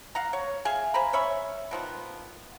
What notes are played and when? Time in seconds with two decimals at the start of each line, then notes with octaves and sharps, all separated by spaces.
0.15 F5 F#5 A#5
0.33 C#5
0.65 G#4 E5 F5 G#5
0.94 C5 G#5 A#5 B5
1.13 C#4 C#5 E5 B5
1.71 D#3 F3 B3